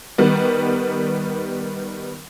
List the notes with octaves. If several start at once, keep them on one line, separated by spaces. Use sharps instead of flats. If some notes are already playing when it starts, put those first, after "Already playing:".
D#3 G3 B3